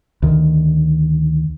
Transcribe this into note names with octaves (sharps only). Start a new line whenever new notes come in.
D2 D#3